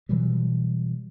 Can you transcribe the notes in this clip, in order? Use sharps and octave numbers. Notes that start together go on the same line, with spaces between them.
B2 E3 F#3 G3